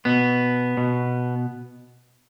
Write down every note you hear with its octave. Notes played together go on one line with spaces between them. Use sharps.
B2 B3
B2